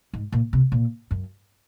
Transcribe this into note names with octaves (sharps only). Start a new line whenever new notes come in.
G#2
A#2
C3
A#2
F#2